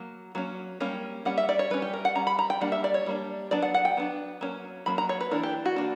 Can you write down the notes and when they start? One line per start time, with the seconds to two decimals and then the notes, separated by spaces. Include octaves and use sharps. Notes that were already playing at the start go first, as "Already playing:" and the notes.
Already playing: F#3 A#3
0.35 F#3 A#3 C#4
0.80 G3 A#3 C#4
1.25 G3 A#3 C#4 F#5
1.38 E5
1.49 D5
1.59 C#5
1.70 G3 C#4 B4
1.82 G4
1.93 A#4
2.05 F#5
2.15 G3 C#4 A#5
2.27 B5
2.39 A#5
2.50 G5
2.61 G3 A#3 D4 F#5
2.72 E5
2.84 D5
2.94 C#5
3.06 G3 A#3 D4
3.51 F#3 B3 D4 D5
3.62 F#5
3.74 F#5
3.85 G5
3.97 F#3 B3 D4
4.41 F#3 A#3 C#4
4.86 F#3 A#3 C#4 B5
4.98 A#5
5.09 C#5
5.21 B4
5.31 E3 A#3 D4 A#4
5.43 G4
5.66 F#4
5.76 E3 A#3 D4